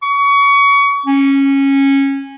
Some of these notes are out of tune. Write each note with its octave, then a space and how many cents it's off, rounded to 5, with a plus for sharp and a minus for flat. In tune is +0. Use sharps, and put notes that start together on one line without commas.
C#6 +30
C#4 -15